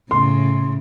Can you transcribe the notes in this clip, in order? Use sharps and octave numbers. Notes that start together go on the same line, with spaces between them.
A2 C#3 C6